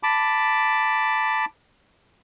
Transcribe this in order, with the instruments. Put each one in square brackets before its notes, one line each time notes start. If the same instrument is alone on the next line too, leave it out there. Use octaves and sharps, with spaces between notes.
[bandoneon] A5 B5 D6